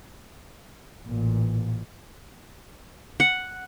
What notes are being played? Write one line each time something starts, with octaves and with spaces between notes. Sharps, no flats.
A1 A#2
F#5